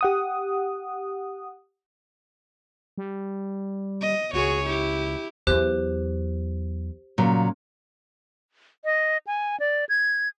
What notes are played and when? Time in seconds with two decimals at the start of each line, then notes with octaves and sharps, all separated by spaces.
0.01 G4 F#5 D#6
2.98 G3
4.01 D#5
4.33 C#2 F#4 G#4 C#5
4.66 E4 G4
5.47 E2 F#3 G4 C5 F#6
7.18 A#2 C#3 F#3
8.85 D#5
9.27 G#5
9.60 D5
9.89 G#6